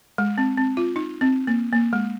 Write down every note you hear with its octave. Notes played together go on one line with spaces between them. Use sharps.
G#3
C4
C4
F4
D#4
C4
A#3
A#3
G#3